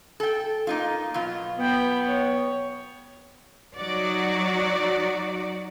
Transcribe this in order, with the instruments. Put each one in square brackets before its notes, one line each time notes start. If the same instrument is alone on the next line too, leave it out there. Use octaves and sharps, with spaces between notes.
[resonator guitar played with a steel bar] A4 G5
A#3 D#4 F4
B2 F#3 F4
[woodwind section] B3 [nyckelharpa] G5 B5
[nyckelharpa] C#5
[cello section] F#3 D#4 F#4 D5